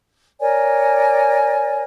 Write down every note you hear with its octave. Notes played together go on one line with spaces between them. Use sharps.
A#4 C#5 D5 G#5